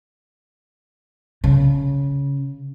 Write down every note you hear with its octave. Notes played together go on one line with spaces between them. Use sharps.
C#3